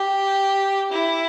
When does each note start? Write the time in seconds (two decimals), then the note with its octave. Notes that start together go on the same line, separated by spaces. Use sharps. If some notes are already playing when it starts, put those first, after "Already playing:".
Already playing: G4
0.92 E4